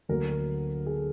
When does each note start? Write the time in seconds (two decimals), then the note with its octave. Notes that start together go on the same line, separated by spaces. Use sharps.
0.09 D2 D3 F#3 A#3 A#4
0.86 G#4
0.91 A4